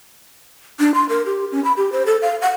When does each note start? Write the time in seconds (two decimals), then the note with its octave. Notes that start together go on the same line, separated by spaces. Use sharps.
0.80 D4
0.94 C6
1.09 A#4
1.26 G4
1.52 C#4
1.64 B5
1.77 G4
1.92 C5
2.06 A4
2.22 F5
2.42 F#5